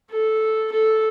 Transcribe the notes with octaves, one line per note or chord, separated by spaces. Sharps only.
A4
A4